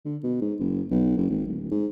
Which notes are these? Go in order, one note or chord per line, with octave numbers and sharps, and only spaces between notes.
D3
B2
G#2
F#1
B1
F#1
G#1
D1
G#2